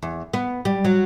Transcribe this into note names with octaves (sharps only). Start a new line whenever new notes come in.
E2
B3
G3
F#3